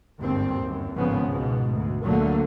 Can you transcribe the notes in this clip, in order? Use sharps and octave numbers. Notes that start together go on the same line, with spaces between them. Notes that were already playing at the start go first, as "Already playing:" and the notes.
G1 D#2 G#2 C4
G1 F#2
G#1 D#2 A2 C#3 F3 B3
C#2 G#2 B2
D2 B2
D2 A#2 D3 F#3 A3 A#3